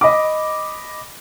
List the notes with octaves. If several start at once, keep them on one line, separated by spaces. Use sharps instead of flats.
D#5 B5 D6